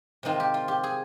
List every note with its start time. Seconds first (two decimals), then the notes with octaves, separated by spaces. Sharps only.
0.23 C3 D#3 G#3 C4 D#4 F4
0.40 G4
0.54 F4
0.68 G4
0.83 G#4